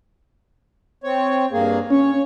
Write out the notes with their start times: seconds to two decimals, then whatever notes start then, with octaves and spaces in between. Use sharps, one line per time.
1.04 C4 C#5
1.52 G2 A#3 G#4
1.90 C#4 C#5